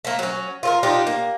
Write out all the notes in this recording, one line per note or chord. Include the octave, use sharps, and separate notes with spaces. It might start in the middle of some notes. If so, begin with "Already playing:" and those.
A3 A#3
F#3 C#4
F4 A4 A#4
D4 D#4 F4 G4
A#3